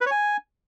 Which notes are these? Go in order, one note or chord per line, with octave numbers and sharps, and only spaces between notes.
B4
C#5
G#5